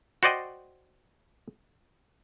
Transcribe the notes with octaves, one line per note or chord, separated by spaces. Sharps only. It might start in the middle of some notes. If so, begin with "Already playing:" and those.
F#4 C5 D5 D#5 G5